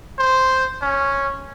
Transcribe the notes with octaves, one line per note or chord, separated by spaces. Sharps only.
C5
C#4